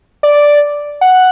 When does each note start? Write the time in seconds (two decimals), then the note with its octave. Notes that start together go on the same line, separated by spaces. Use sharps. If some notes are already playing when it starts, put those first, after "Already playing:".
0.23 D5
1.01 F#5